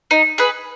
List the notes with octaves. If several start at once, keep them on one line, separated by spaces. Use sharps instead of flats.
D#4
G#4 B4